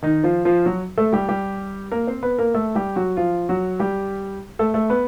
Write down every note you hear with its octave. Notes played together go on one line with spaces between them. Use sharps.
D#3 D#4
F3 F4
F3 F4
F#3 F#4
A3 A4
G3 G4
G3 G4
A#3 A#4
C4 C5
B3 B4
A#3 A#4
A3 A4
G3 G4
F#3 F#4
F3 F4
F#3 F#4
G3 G4
A3 A4
A3 A4
B3 B4